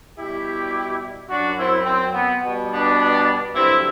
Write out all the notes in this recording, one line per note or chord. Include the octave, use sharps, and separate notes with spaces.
B2 G3 E4 G4
F#2 F#3 D4 F#4
C4 E4
C4
B3
B2 G3
B3 D4
G2 D3 F#3 C4 E4